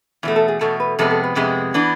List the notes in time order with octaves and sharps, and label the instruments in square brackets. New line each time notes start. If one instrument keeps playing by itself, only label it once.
[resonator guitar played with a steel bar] E2 B2 A3 [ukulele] E4
[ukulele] A4
G#4
[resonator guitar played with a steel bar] E2 B2 A3 [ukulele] A4
[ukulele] B4
[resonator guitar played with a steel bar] F2 C3 G#3 B3 [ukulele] A4
[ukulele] A4
B4
[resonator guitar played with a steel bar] F2 C3 G#3 B3
E3 B3 D4